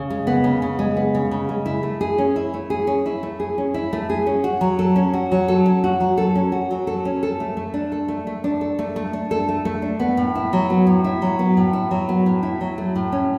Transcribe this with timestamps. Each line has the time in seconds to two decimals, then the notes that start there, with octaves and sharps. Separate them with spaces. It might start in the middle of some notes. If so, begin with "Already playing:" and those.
Already playing: C#3
0.10 G#3
0.27 B3
0.44 C#3
0.62 C#3
0.79 G#3
0.97 B3
1.15 C#3
1.31 C#3
1.49 G#3
1.66 E4
1.83 A3
2.01 G#4
2.18 C#4
2.36 E4
2.54 A3
2.70 G#4
2.87 C#4
3.06 E4
3.23 A3
3.40 G#4
3.58 C#4
3.74 E4
3.93 A3
4.10 G#4
4.26 C#4
4.44 F#4
4.61 F#3
4.79 A4
4.96 C#4
5.14 F#4
5.32 F#3
5.48 A4
5.66 C#4
5.84 F#4
6.00 F#3
6.18 A4
6.35 C#4
6.52 F#4
6.71 F#3
6.87 A4
7.05 C#4
7.23 A4
7.40 A3
7.57 A3
7.74 D4
7.92 A4
8.08 A3
8.27 A3
8.44 D4
8.61 A4
8.79 A3
8.96 A3
9.13 D4
9.31 A4
9.49 A3
9.65 A3
9.82 D4
10.00 B3
10.17 A2
10.35 E4
10.53 F#3
10.70 B3
10.87 A2
11.04 E4
11.22 F#3
11.39 B3
11.57 A2
11.73 E4
11.91 F#3
12.09 B3
12.26 A2
12.43 E4
12.61 F#3
12.78 A3
12.96 A2
13.12 C#4